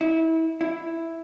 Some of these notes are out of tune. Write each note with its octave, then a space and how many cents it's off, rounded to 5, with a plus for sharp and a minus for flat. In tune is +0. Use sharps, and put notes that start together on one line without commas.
E4 -30
E4 +0